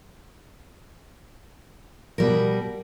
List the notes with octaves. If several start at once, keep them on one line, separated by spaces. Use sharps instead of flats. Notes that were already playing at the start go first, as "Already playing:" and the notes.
B2 G3 A#4